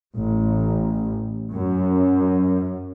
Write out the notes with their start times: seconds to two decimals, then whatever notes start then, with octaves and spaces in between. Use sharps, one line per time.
0.16 A1
1.52 F#2